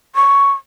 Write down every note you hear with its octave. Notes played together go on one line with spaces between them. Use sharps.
C#6